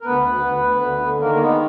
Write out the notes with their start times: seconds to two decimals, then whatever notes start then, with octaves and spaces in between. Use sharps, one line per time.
0.01 A#4
0.05 D2 B3 B4
0.24 D2
0.43 D2
0.63 D2
0.82 D3
1.01 D3
1.20 D#3 A#3 A#4
1.35 A#3
1.40 G#3 B3